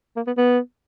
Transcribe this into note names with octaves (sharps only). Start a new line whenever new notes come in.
A#3
B3
B3